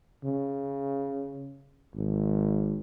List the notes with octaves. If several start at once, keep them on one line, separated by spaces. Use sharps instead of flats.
C#3
G#1